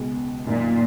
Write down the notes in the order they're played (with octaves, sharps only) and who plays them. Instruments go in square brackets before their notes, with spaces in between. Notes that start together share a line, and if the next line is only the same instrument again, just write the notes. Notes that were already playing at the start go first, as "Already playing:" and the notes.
Already playing: [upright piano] C#2 B2 G#3
[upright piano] F#2 D#3 A#3 D#4 [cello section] A#2